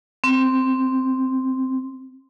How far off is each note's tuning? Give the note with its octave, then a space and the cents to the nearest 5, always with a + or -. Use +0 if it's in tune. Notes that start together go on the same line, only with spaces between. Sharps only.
C4 -5